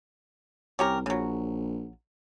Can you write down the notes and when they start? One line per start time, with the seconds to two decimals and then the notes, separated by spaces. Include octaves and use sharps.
0.79 C2 C#4 G4 A#4
1.06 A#1 C#3 F#3